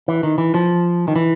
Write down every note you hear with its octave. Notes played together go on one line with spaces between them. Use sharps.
E3
D#3
E3
F3
D#3
E3